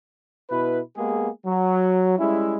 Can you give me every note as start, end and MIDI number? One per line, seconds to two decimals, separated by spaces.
0.50 0.80 47
0.50 0.80 64
0.50 0.80 71
0.97 1.28 56
0.97 1.28 58
0.97 1.28 59
0.97 1.28 67
0.97 1.28 68
1.46 2.18 54
2.18 2.57 55
2.18 2.57 56
2.18 2.57 61
2.18 2.57 64